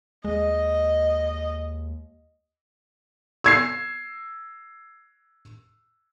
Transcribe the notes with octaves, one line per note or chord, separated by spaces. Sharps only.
D#2 G#3 D#5
E6 G#6 C7